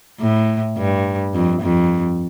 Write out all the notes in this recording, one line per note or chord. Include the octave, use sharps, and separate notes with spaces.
A2
G2
F2
F2